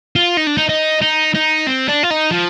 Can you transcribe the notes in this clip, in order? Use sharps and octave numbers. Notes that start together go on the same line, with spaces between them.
F4
D#4
D4
D#4
D#4
D#4
D#4
C4
D4
F4
D#4
F3